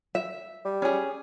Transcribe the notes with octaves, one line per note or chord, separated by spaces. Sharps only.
E5
G3
C#4 G#4